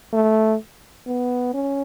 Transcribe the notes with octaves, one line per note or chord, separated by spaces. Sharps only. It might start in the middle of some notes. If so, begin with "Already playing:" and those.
A3
B3
C#4